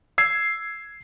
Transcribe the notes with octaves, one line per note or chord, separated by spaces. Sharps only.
E6 G#6 C7